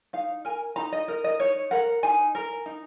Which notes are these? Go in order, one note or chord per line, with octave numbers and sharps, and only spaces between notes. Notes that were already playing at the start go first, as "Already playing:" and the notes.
D#4 F5
A#4 G#5
D#4 A#5
D#5
A#4 D#5
D#5
D#4 C#5
A#4 F#5
D#4 G#5
A#4
D#4